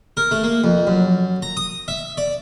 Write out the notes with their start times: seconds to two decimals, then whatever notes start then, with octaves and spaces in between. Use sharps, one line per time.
0.17 A#4
0.31 A3
0.44 A#3
0.64 F2
0.87 F#2
1.42 A#5
1.57 D#6
1.88 E5
2.17 D5